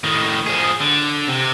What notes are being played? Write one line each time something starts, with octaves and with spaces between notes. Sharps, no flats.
A2 D#3
F3 G#4
D3
C3